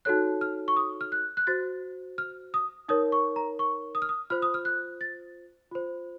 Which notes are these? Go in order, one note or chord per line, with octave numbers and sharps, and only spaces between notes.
D#4 F#4 A4 C#5 F#6
F6
C#6
D#6
F6
F#6
F#6
F#4 C5 A6
F6
D#6
D#4 A#4 C#5 D#6
C#6
A#5
C#6
D#6
F6
D#6
F4 C5 F6
D#6
F6
F#6
A6
F4 C5